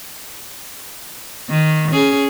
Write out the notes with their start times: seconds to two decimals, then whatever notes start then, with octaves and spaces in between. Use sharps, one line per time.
1.50 D#3
1.92 C#4 G#4